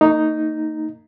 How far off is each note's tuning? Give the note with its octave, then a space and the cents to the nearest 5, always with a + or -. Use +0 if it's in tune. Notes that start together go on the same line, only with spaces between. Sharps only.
A#3 -45 D#4 +0